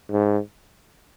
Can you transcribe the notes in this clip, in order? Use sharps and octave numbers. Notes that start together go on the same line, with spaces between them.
G#2